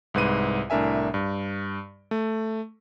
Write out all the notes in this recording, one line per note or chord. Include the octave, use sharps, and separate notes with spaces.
C2 G#2 B4 D#7
C2 A2 D4 A#4 E5 G#5
G2
A3